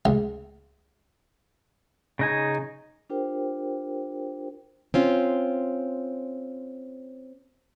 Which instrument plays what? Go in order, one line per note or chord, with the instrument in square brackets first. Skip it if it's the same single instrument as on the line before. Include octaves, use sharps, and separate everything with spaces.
[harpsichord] C#2
[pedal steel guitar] C#3 D#4 G#5
[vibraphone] D4 F4 G4 A#4 C5 G5
[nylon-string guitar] C4 C#4 F4